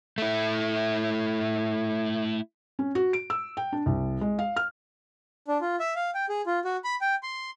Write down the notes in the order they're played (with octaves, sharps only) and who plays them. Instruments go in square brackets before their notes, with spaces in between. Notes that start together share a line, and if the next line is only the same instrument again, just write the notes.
[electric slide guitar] A3 E4
[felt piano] C#4
F#4
D7
E6
G5
D4
C2
G#3
F5
F6
[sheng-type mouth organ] D4
F4
E5
F5
G5
G#4
F4
F#4
B5
G5
C6